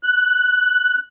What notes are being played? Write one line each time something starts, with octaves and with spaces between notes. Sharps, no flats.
F#6